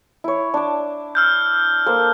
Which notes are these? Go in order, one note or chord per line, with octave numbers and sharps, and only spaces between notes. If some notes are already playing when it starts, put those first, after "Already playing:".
E4 C#5
D4 D6
E6 F6 G6
A#3 A4 C5